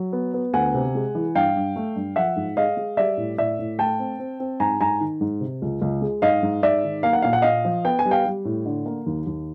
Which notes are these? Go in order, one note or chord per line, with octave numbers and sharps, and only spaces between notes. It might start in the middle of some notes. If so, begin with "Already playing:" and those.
Already playing: F#3
B3
B3
D2 F#5 G#5
C3
G#3
E3
G2 F5 G5
G2
A3
G2
F3 E5 F#5
G#2
G#3 D#5 F5
G#3
G3 D5 E5
A2
A2 D5 E5
A2
A3 G5 A5
C4
C4
C4
G#2 G#5 A#5
G#2 G#5 A#5
D#3
G#2
C3
C#2
C#2
G#3
G#2 D#5 F5
G#2
G#2 D5 E5
D#3
A#3 F5
F#5
A#2 F5
F#5
A#2 D#5 F5
F3
B3 G5
G#5
G3
F5 G5
G3
A2
D3
A#3
D#2
D#2